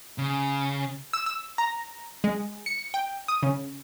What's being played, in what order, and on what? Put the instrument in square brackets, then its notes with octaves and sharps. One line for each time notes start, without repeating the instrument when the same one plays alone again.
[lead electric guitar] C#3
[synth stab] E6
E6
A#5
G#3
C#7
G5
D#6
C#3